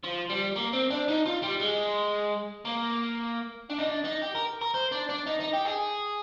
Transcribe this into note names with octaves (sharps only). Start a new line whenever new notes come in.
F3
G3
A#3
C4
D4
D#4
F4
G3
G#3
A#3
D4
D#4
D4
D#4
G4
A#4
A#4
C5
D4
D4
D#4
D#4
G4
G#4